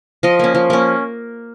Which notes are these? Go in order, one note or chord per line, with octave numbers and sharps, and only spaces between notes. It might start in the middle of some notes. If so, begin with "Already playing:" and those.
F3 D#5
A#3 C#4
F3
A#3 C#4